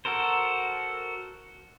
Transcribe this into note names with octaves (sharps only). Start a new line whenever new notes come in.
F#4 A4 A#4 C5